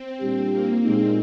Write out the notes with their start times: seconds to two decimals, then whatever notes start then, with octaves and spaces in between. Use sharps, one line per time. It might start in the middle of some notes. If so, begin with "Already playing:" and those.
Already playing: C4
0.21 A#2 G3 D4 G4
0.52 A#3
0.83 A#2 G#3 C4 D#4